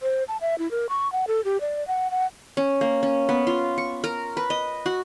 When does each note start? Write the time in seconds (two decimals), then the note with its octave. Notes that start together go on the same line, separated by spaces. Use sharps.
0.02 C5
0.28 A5
0.41 E5
0.58 E4
0.71 A#4
0.89 C#6
1.12 F#5
1.27 A4
1.44 G4
1.61 D5
1.88 F#5
2.11 F#5
2.57 C#4
2.81 A#3
3.03 C#4
3.29 B3
3.47 F4
3.78 C#6
4.04 A#4
4.37 B4
4.50 D#5
4.86 F#4